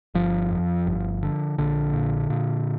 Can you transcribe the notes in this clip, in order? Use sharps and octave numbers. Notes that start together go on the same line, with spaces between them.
G1 F3
F2
G1
D3
A#1 D3
A#2
A#2